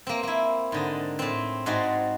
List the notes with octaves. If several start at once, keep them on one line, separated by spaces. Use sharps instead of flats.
A#3 C4
A#3 E4
G#2 D3 D#5
A2 C4
G#2 G#3 F#4 D5 C6